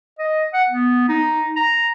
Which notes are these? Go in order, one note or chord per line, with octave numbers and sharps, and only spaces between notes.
D#5
F#5
B3
D#4
A#5